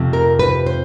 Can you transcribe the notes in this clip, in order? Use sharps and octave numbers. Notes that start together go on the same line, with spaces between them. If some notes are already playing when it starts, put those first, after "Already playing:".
Already playing: F2 C3 F3 A3
A#4
B4
C5